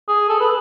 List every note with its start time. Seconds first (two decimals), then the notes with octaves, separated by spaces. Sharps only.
0.08 G#4
0.29 A4
0.41 B4